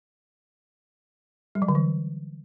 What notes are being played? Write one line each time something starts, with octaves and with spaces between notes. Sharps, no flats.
G3
F#3
D3
E3